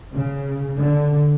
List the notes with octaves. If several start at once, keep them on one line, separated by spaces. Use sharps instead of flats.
C#3
D3